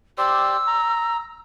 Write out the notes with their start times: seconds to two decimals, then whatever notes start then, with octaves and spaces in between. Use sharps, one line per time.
0.18 G4 C5 D5 E6
0.67 A#5